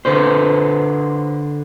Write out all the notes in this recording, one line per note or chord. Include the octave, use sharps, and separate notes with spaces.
D3 B4 C5